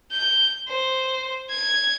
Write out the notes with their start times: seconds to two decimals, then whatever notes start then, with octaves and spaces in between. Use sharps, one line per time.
0.12 G6
0.68 C5
1.50 G#6